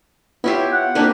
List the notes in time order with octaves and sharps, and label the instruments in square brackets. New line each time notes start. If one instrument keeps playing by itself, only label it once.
[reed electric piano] B3 C#5 E5 [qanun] E4 F4 G4
[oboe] F#5
[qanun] A#3 G4 B4 [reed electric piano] C4 D4 D#4